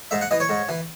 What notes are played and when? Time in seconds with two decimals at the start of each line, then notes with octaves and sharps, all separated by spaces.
0.11 G#2 E5
0.21 F#5
0.31 E3 D#5
0.40 C#5
0.49 G#2
0.69 E3